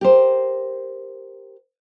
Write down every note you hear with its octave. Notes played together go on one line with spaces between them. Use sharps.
G4 A#4 C5